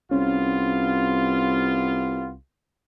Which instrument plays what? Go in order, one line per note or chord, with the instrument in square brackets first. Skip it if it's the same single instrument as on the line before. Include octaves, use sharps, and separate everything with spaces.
[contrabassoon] C2 [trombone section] B3 F4 [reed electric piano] C#4